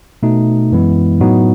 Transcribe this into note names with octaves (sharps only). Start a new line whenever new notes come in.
B2 A3 D#4
F#2 E3 G#3 B3 E4
A2 F#3 B3 D#4 F#4